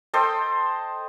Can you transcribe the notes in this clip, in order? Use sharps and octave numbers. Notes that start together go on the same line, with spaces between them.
A4 C5 D#5 G5